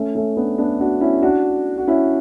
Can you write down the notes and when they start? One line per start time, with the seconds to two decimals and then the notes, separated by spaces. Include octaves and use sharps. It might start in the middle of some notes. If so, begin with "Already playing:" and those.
Already playing: A3 C#4
0.15 A3 C#4
0.37 B3 D4
0.58 B3 D4
0.80 D4 F#4
1.01 C#4 E4
1.22 D4 F#4
1.78 F#4
1.87 C#4 E4